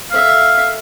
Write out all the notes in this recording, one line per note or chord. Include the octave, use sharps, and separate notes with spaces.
A4 E5 F5